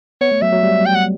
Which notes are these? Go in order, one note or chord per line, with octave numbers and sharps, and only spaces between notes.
B3 C#5
A3
F#3 E5
F#3
G3
G5
F#5